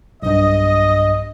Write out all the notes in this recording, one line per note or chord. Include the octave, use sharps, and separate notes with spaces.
B1 G2 D#5